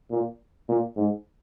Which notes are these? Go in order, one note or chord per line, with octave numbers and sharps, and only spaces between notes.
A#2
A#2
G#2